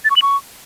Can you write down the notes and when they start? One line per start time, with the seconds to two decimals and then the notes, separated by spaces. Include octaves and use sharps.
0.05 A6
0.10 C#6
0.16 F#7
0.22 C#6